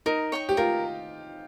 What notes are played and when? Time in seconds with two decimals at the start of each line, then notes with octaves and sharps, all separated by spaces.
0.06 D#4 A#4
0.32 C#5 G5 C#6
0.49 G4
0.57 F4 A#4